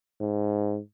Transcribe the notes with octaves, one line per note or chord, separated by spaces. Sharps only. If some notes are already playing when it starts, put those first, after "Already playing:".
G#2